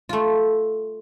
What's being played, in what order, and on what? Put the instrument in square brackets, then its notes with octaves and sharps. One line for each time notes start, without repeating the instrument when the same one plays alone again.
[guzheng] A3 F4